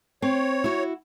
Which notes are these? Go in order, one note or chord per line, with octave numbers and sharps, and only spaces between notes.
C4 C#5
E4 F#4